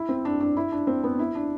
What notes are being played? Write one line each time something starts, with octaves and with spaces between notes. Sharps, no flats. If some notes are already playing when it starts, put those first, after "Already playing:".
Already playing: E4
C4
D4
D4
E4
D4
C4
B3
E4
D4